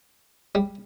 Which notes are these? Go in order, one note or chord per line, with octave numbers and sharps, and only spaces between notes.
G3